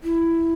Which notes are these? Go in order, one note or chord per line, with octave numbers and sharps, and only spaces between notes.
E4